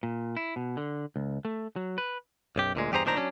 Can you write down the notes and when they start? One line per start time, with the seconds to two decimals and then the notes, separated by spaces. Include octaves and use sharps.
0.03 A#2
0.37 E4
0.56 B2
0.77 D3
1.16 C#2
1.45 A3
1.76 F#3
1.98 B4
2.56 B1 F#2 G4
2.75 D2 A#2 G#3
2.91 E2 G2 G4 G#4 C5 A#5
3.05 B1 A#2 D#3 D4 C5 A#5
3.17 F#3 C#4 D4